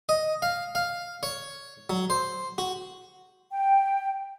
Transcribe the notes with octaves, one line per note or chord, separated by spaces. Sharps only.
D#5
F5
F5
C#5
F#3
C5
F#4
G5